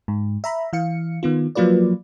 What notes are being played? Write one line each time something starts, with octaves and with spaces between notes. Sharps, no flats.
G#2
E5 A#5 B5
E3 F5 C#7
D#3 B3 F4
F3 F#3 A#3 F4 B4 D5